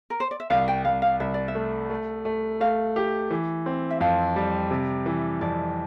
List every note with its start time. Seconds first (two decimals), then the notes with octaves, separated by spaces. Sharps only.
0.10 A#4
0.20 C5
0.31 D5
0.40 E5
0.50 C2 F5
0.68 G5
0.85 C2 F5
1.02 F5
1.20 C2 E5
1.34 D5
1.48 E5
1.55 A3
1.90 A3
2.25 A3
2.60 A3 F5
2.96 G4
3.30 E3
3.66 C4
3.90 E5
4.01 F2 F5
4.36 G3
4.71 C3
5.06 E3
5.41 F2 D5